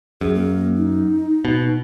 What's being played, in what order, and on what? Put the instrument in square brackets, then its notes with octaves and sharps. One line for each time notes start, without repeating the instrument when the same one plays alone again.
[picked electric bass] F#2 [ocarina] G#4
[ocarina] A#3
D#4
[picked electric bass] B2